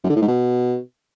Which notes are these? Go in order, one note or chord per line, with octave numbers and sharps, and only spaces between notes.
F#2
D3
A2
G#2
B2